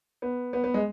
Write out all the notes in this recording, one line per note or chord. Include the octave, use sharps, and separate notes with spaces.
B3
B3
B3
G#3